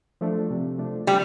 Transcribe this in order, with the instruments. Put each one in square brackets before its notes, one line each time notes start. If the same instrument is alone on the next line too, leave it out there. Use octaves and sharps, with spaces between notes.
[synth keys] F3 A3 D4
C3
F3 A3 D4
[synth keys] C3 [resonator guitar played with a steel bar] G3